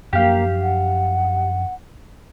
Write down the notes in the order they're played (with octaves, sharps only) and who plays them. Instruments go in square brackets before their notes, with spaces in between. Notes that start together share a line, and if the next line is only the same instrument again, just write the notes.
[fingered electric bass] F#2 F3 D4 [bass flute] A#3 [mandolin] G4 F5
[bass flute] F#5